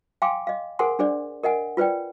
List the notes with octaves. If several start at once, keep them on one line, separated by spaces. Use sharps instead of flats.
F5 G5 G#5 C6 D6
D#5 F5
G#4 A#4 C5 F#5 G#5 C6
D4 G#4 C5 D5
A#4 D#5 F#5 G#5
F4 B4 C5 D5 G5